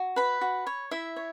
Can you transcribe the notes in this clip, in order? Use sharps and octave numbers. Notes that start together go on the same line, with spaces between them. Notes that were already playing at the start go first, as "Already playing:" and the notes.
Already playing: F#4
B4 B5
F#4
C#5
E4 E5
C#5